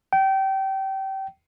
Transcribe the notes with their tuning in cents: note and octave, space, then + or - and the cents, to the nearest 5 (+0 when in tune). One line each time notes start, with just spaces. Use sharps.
G5 -25